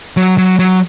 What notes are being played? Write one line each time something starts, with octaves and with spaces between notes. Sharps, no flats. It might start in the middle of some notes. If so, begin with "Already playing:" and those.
F#3
F#3
F#3